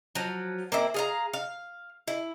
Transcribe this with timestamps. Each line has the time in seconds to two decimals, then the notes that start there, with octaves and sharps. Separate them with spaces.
0.15 F3 F#3
0.72 A#3 C4 E4
0.94 G#4 F5 A#5
1.33 F5
2.08 E4